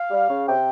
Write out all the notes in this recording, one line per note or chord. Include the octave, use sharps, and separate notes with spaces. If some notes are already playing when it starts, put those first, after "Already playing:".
Already playing: F5
G3
C#3
C3 G5